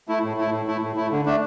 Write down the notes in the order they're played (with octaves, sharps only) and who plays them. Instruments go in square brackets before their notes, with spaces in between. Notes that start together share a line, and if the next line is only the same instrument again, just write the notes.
[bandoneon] A3 E4
A2
A3 E4
A2
A3 E4
A2
A3 E4
D3
A3 D4